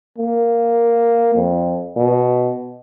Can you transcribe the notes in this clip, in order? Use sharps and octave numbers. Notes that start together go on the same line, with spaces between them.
A#3
F2
B2